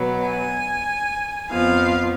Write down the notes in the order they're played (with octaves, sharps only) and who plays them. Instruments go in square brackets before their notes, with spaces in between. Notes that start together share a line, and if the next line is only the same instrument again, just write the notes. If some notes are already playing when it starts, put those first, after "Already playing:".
Already playing: [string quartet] B2 F#3 B3
G#5
F2 F3 B3 F5